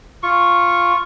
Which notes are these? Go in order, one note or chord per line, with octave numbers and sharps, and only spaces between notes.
F4 C#6